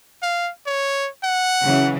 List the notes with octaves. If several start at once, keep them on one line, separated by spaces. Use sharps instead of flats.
F5
C#5
F#5
C#3 E3 F#3